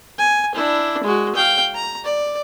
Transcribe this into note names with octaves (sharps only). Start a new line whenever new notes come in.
G#5
D4 E4
G#3 F#4
F5 G5
A#5
D5